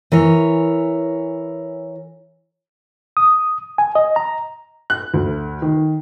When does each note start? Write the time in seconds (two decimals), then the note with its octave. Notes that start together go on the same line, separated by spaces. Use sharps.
0.12 E3 A#4 C#5
3.17 D#6
3.78 G#5
3.95 D#5
4.16 A#5
4.90 F#6
5.14 D2
5.62 D#3